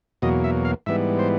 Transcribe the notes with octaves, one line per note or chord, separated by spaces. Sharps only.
E2 B2 F#3 A#3 D#5
E5
F5
G#2 E3 G3 B3 E5
C5